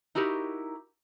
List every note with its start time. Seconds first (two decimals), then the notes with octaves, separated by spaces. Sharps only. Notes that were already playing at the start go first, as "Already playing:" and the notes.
0.15 D#4 E4 F#4 G4 A#4